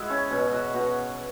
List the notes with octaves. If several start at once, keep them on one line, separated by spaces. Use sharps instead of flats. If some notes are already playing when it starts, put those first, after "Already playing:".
Already playing: G#3 E4 F#4 E5 F#5
C#4 C#5
B2 C#4 C#5
F#4 F#5
B2 F#4 F#5